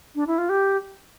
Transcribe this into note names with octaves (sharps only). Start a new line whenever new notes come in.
D4
E4
F4
G4